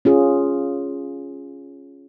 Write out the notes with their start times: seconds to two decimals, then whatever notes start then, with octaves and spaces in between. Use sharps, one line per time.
0.05 C#4 F4 G#4